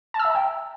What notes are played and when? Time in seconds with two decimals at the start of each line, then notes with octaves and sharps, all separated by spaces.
0.14 A5
0.19 E6
0.25 E5
0.30 A#5
0.35 G5